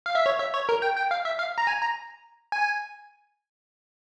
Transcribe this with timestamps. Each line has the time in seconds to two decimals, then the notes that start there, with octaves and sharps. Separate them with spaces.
0.06 F5
0.15 E5
0.26 C#5
0.39 E5
0.54 C#5
0.69 A#4
0.82 G5
0.97 G5
1.11 F5
1.25 E5
1.39 F5
1.58 A#5
1.67 G#5
1.81 A#5
2.52 G#5